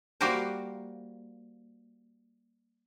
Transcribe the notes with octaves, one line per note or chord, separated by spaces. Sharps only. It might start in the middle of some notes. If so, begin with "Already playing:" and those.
G3 A#3 F#4 G4 A#4 C5